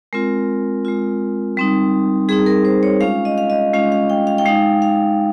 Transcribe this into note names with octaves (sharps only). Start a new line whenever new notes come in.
G#3 C4 F4 A#4
G#3 C4 F4
G3 C4 D#4
G3 C4 D#4 G#4
A#4
C5
C#5
G#3 C#4 F4 F5
D#5
F5
D#5
G#3 C#4 F4 F5
F5
G5
F5
G5
G#3 D#4 F5
F5